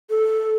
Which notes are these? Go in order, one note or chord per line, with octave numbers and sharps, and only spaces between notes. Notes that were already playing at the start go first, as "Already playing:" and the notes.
A4